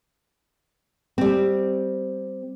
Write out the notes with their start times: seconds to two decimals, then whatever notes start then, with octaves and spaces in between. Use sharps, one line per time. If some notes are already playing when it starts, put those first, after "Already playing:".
1.18 G3 C4